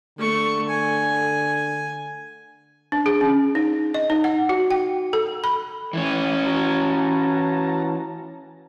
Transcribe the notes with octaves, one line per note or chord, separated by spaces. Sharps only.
D3 A3 C#6
G#5
D4
G#4
C#4
D#4
D#5
D#4
F#5
F#4
G5
A4
B5
E3 C#4
F#4 A5 A#5